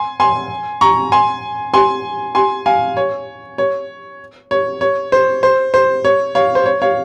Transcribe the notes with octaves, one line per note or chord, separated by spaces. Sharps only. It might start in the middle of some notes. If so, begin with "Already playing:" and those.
Already playing: G#5 C6
G#5 C6
A#5 C#6
G#5 C6
G#5 C6
G#5 C6
F5 G#5
C#5
C#5
C#5
C#5
C5
C5
C5
C#5
C#5 F5
C5
C#5
C#5 F5